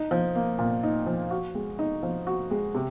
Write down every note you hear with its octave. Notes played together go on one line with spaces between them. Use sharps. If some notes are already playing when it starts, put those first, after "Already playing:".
Already playing: D#4
F3
A#3
A#2
D#4
F3
F#4
G#3
D#4
F3
F#4
G#3
C3